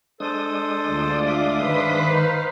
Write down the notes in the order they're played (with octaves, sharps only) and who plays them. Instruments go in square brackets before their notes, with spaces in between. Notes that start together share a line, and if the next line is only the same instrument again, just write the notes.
[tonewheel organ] G#3 D4 D#6 [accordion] A4 C5
[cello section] D2 F4 D5
[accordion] E5 F5 D6
[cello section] D#3 B4 C5
[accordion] D#4 [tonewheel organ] F5